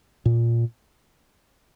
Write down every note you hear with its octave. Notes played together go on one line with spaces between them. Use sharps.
A#2